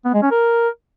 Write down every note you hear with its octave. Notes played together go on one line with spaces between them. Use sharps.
B3
G#3
C#4
A#4